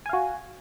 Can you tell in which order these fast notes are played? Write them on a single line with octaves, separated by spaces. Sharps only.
G#5 F5 F#4